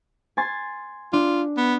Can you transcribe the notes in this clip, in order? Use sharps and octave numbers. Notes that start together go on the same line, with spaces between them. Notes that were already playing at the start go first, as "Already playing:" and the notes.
G#5 C6 A6
D4 F4
B3